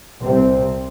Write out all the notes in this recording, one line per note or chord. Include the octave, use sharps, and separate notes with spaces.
C2 C3 C4